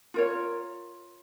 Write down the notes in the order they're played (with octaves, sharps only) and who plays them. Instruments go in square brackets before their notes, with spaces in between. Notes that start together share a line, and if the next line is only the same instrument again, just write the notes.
[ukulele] F4 A#4 C#5